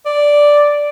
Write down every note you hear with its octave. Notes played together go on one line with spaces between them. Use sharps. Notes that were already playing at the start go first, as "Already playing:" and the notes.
D5